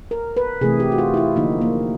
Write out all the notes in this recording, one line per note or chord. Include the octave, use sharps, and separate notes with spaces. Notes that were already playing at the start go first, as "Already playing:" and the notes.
A#4
B4
C3 E3 A3 G#4
G4
F#4
F4
E4
F4
D3 F3 A#3 D#4
A#3